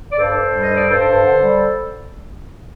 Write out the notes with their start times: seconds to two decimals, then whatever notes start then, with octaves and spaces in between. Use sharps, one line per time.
0.12 D5
0.18 G2 A4 C5
0.35 G2
0.53 G3
0.63 D#5
0.72 G2 D5
0.90 G2 A4 C5
1.07 G2
1.25 D3
1.43 G3